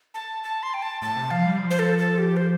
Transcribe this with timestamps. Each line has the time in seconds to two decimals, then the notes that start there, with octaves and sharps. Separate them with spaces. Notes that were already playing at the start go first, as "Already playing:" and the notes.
0.14 A5
0.43 A5
0.63 C6
0.74 G5
0.82 A5
1.02 A2 A5
1.16 C3
1.31 F3 F5
1.45 G3
1.59 F3
1.71 C5
1.79 A4
1.98 A4
2.18 G4
2.37 C5